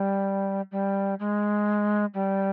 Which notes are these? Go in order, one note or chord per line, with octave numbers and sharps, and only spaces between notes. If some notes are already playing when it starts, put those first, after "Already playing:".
Already playing: G3
G3
G#3
G3